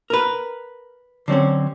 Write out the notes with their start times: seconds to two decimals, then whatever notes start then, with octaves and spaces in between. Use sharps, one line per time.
0.10 A#4 B4
1.28 D3 F#3 C4 C#4